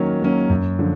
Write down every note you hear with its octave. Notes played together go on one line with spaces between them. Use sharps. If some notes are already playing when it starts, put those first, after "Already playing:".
Already playing: D#3 F#3 A#3 C#4
F#3 A#3 C#4
F#2
D3 F3